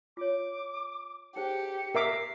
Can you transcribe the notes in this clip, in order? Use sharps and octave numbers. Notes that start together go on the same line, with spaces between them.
F4 C#5 D6
D#4 G4 G#4 C5 C#7
A#4 E5 D6 C7